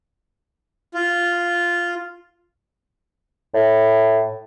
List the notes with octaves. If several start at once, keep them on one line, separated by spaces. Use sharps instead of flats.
F4
A2